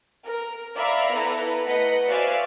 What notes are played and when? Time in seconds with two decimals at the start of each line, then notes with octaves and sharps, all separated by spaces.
0.24 A#4
0.75 D5 E5 F5 A#5 B5
1.11 B3 E4 A4 B4 A#5
1.66 A3 B4 D#5 F#5 B6
2.06 F#4 C5 D5 E5 F5 G#5